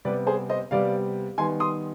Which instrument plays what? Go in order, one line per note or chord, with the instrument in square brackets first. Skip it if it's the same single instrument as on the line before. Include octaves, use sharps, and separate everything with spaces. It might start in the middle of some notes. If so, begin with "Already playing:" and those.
[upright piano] C3 G3 B3 B4 D5
G#4 C5
C5 D#5
C3 G3 B3 D5 F5
D#3 G3 B3 G#5 C6
C6 D#6